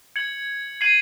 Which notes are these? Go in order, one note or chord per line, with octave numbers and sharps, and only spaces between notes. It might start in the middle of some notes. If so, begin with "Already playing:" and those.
G#6 C#7 F#7
G#6 C7 D#7 F#7